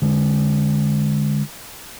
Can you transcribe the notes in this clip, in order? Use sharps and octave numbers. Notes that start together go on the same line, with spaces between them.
D3 G#3